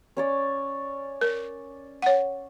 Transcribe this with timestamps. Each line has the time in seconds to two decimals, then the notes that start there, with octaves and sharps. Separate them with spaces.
0.17 C#4 C#5 D5
1.21 A#4
2.02 C#5 F#5